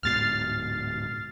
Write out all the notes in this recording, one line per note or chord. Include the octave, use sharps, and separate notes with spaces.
D1 G#2 B2 F6 A6 C7